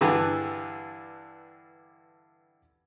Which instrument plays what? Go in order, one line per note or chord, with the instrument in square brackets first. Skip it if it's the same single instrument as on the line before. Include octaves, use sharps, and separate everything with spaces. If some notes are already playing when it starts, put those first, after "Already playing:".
[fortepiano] G2 D3 E3 G4 B4 A5